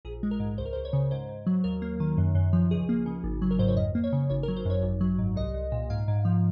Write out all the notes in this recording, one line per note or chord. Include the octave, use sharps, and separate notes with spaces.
A#1 G#4
G#3
A#4
G#2
C#2 C5
A#4
C5
C#2
C#5
C#3
G#2 C5
G#2
F#3
D#2 A#4
A#3
D#3
F#2
F#2
F3
C#2 G#4
A#3
C#3
G#1
F#3
A#4
G#2 C5
C#5
F2 D#5
A#3
C#5
C#3
G#1 C#5
A#4
F#3
C5
F#2 C#5
G#1
F#3
G#2
C2 D#5
C2
A#2
G#2 F5
G#2
F3